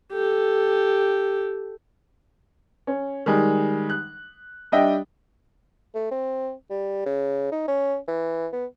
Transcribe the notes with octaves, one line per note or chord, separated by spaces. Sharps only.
G4 A4
C#4
D#3 G3 G#3
F#6
G3 D4 D#5 E5 G5
A3
C4
G3
C#3
D#4
C#4
E3
B3